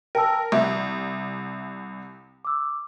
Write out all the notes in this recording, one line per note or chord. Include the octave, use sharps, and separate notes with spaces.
A#4 G5 A5 E6
C2 E5
D6 E6